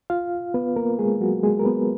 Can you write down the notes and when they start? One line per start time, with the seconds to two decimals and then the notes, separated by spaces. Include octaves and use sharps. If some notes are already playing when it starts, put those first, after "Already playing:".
0.10 F4 F5
0.54 B3 B4
0.76 A#3 A#4
0.99 G#3 G#4
1.20 F#3 F#4
1.43 G#3 G#4
1.59 A#4
1.65 B3 B4